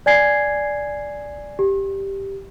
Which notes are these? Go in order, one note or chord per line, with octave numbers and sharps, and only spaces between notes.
D5 G#5 G#6 C7
G4